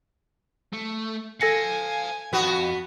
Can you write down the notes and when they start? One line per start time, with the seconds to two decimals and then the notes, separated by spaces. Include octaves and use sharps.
0.73 A3
1.41 A4 F5 G#5 A5 A#6 C#7
2.33 F2 B3 F#4